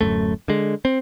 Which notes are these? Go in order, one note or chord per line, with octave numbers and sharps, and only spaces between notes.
D1 C#2 F#2 A3
D3 G#3
C4